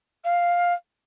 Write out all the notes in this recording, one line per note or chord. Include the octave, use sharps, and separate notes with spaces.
F5